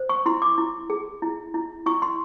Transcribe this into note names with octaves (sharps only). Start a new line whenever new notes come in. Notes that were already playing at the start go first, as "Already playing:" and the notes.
Already playing: C5
C#6
E4 C6
D6
E4
G#4
E4
E4
E4 C#6
C6